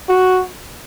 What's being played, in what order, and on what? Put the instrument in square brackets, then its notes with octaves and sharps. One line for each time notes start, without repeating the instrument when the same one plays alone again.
[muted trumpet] F#4